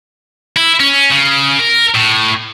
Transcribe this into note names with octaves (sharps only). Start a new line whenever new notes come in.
E4
C#4
C#3
A#4
A2